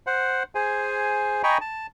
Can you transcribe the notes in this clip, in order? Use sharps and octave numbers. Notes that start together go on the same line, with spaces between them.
C5 F#5
G#4 C5 G#5
D#5 G5 G#5 A#5 B5 C#6
A5